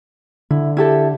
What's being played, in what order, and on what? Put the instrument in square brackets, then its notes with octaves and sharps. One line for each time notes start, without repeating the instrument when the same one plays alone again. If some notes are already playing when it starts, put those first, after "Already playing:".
[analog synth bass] D3 [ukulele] E4
[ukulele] E4 G4 A4